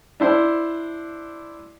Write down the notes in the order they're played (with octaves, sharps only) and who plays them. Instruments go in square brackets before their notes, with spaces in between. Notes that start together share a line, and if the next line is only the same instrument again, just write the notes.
[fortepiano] D4 E4 C5